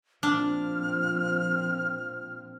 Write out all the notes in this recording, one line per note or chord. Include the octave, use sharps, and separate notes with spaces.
A#2 F3 C4 D4 F6